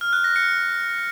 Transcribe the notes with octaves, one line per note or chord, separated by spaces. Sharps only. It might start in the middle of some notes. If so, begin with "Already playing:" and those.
F6
F#6
A#6
C#7